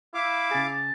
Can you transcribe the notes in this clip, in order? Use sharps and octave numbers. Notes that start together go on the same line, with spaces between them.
E4 F5 D6
C#3 G#4 A5